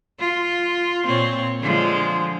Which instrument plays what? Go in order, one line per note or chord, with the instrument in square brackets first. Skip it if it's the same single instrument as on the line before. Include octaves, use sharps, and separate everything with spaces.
[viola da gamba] F4
A#2 C4 C#5
D3 F3 G#3